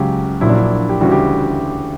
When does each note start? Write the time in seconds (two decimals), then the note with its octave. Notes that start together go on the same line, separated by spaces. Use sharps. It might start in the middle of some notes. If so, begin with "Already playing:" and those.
Already playing: C#2 C#3 F#3 G4
0.41 A#1 A#2 F#3 E4
0.49 D4
0.57 E4
0.89 G4
1.01 D2 C#3 E3 G3 F#4
1.12 G4